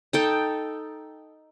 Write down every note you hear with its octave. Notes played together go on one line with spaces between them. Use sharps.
D#4 A4 G5